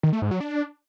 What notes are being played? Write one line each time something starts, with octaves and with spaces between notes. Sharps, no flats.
D#3
A3
G#2
F#3
D4